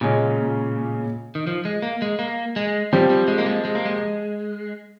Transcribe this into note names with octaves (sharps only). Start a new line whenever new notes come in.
A#2 C#3 G#3 C#4
D#3
F3
G#3
A#3
G#3
A#3
G#3
F3 G3 C4 G4
G3
G#3
A#3
G#3
G#3
A#3
G#3